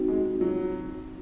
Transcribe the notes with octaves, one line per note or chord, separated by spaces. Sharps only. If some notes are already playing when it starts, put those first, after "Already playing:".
Already playing: C4 D#4 F#4
G#3
F#3